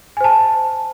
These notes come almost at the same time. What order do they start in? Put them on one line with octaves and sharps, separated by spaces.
G#5 C5 A5